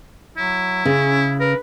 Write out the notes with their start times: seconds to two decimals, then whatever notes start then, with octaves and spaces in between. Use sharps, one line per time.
0.37 F#3 E4
0.85 C#3 C#4
1.41 A#4 B4